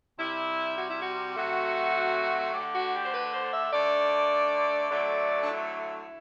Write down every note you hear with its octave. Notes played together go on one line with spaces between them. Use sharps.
C3 G3 E4
F#4
E4
F#4
C3 F#3 A3 F#4
D3 A3 G4
F#4
G4
C5
B4
C5
E5
D3 A3 D5
D3 F#3 A3 D5
D4
E4